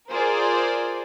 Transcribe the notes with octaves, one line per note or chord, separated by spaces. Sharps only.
F4 G#4 A#4 C5 D5